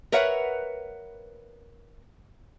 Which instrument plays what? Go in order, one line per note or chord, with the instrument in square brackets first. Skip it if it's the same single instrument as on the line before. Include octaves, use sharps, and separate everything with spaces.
[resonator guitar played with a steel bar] A#4 B4 C#5 E5 F#5